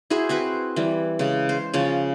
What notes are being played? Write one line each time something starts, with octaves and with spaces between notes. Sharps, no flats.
E4 F#4 G#4 C5
C4 F#4 B4 C5
E3 G3
C#3 G#3
C5
C#3 F3 C#4